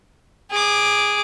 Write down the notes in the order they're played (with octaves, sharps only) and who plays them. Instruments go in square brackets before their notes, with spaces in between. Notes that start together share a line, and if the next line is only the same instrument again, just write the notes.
[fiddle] G#4 D6